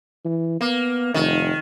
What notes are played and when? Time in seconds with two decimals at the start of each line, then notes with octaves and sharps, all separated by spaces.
0.25 E3
0.61 A#3 B3
1.14 F1 D#3